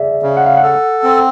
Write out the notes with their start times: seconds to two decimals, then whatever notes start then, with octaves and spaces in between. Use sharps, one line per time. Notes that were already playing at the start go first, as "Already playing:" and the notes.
Already playing: G#4 D5 E5
0.23 C#3
0.37 F#5
0.46 F5
0.57 F#5
0.63 A4
1.04 C4